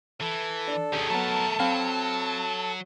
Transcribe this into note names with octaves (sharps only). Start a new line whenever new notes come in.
E3 A4
D4
D#3 C#4 G4 G#4
F#3 A3 B3 A#4 A5
F#3 C4 F5 B5